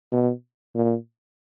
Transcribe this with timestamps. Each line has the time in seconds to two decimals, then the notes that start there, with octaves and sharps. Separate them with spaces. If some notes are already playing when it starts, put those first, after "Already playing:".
0.12 B2
0.75 A#2